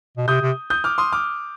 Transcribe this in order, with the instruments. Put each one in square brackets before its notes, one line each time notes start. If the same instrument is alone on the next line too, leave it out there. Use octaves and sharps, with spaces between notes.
[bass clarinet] B2
[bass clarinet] C3 [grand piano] D#6 G6
[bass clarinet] C3
[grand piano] D#6 G6
D6 F6
C6 D#6
D6 F6